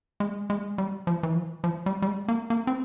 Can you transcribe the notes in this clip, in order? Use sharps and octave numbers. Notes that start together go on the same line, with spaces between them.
G#3
G#3
G3
F3
E3
F3
F3
G3
G3
G#3
A#3
A#3
C4